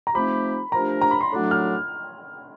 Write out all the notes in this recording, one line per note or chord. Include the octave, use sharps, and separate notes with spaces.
A#5
F3 A3 C4 D#4 G4 B5
F3 A3 D4 G4 A#4 A#5
A#5
B5
C6
A2 F#3 A3 D4 F#4
F6